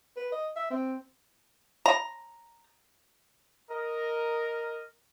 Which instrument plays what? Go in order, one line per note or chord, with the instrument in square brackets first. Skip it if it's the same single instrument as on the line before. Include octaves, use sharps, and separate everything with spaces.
[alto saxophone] B4
D#5
E5
C4
[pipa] A#5
[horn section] A#4 D#5